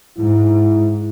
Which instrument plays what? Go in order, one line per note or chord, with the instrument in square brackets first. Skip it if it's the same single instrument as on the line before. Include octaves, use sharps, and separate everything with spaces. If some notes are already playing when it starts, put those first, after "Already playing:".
[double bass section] G#2 [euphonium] E4